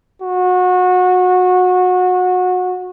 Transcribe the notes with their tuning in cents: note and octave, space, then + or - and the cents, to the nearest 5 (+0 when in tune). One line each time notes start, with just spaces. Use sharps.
F#4 -25